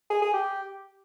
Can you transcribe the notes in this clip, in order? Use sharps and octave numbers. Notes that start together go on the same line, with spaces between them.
G#4
G#4
G4